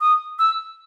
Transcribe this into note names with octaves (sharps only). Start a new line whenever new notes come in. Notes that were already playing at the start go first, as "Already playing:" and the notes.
D#6
E6